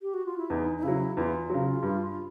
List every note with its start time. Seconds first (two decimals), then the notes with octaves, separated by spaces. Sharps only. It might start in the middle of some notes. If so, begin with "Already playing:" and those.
0.02 G4
0.14 F#4
0.26 F4
0.38 E4
0.50 E2 D#4
0.77 D#4
0.83 C#3 F#3 E4
1.16 E2 F4
1.50 C#3 F#3
1.83 G2